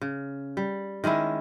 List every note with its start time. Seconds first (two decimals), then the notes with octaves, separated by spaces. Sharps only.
0.01 C#3
0.57 G3
1.04 D#3 G#3 C#4 E4